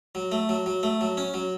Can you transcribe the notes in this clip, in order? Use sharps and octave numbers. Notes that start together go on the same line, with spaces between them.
F#3
A3
F#3
F#3
A3
F#3
C#4
F#3